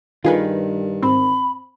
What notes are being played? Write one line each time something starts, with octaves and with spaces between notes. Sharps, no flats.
G2 D#3 F4 G#4 B4
G#1 C4 B5